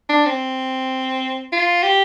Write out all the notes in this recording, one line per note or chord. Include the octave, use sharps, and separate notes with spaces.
D4
C4
F4
G4